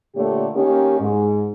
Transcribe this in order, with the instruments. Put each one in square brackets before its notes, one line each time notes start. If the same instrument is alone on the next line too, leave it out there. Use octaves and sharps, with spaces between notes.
[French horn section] A#2 D3 A3 A#3 G4 C#5
D#3 A#3 C#4 G4
G#2